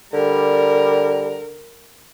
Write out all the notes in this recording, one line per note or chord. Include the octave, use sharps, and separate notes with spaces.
D3 G3 A#4